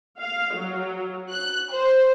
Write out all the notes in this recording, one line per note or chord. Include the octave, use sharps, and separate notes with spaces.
F5
F#3
F#6
C5